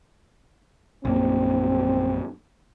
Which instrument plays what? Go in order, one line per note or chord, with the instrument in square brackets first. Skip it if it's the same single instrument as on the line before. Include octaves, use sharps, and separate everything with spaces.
[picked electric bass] A#1 F#2 A#3 [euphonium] C4